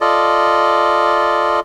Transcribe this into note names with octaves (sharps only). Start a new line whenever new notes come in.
F4 A4 D5 D#5